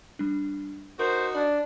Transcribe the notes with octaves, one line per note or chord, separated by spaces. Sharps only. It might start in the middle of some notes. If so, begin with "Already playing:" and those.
G3 D4
D#4 F#4 A#4 C5
D4 D5 B5